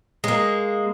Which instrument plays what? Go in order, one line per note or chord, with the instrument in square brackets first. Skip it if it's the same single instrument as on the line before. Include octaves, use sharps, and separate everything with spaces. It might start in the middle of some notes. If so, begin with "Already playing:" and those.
[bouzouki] G#3 A#3